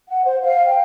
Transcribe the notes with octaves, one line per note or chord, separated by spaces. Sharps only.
F#5
C5
F5
G5